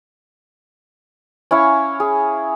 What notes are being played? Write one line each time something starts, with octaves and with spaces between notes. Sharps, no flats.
C#4 E4 F5 C#6
G#4